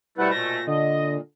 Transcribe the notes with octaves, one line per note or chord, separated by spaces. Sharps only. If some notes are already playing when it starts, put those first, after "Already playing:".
G#2 B2 G3 A3 E4 B4 F#5
A#2 A#6
D3 D#5